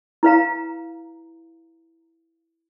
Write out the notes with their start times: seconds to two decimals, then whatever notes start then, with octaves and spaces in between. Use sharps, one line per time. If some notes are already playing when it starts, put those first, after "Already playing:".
0.23 E4 B4 F5 A#5